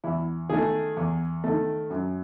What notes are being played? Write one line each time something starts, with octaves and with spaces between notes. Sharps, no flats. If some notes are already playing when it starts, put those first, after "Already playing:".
E2 E4
D#3 A3 G#4
E2
D#3 A3
F#2